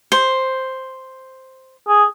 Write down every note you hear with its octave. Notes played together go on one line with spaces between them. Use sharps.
C5
G#4